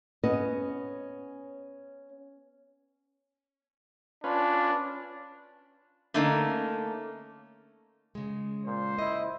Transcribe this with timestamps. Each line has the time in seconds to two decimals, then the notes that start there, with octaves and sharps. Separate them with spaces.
0.24 B3 C#4 D#5
4.24 C#4 D4 F4 B4
6.14 D3 A3 A#3 C#4 D#4
8.15 C#3 G#3
8.65 A#2 C5
8.99 E4 D#5